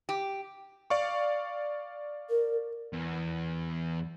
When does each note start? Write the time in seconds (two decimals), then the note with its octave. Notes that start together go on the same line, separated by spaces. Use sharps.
0.09 G4
0.90 D5 F5 C#6
2.30 A#4
2.93 E2